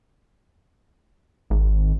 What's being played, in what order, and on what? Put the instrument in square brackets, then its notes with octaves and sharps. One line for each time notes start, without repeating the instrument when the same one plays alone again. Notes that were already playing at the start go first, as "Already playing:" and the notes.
[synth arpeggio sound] G#1